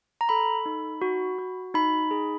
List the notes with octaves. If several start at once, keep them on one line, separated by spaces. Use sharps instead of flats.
A#5
A4 B5
D#4
F#4
F#4
D#4 B5
G#4